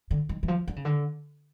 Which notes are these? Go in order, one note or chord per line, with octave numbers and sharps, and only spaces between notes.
D3
D#3
E3
F3
D3
C#3
D3